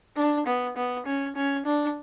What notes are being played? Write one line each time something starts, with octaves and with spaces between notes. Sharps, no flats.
D4
B3
B3
C#4
C#4
D4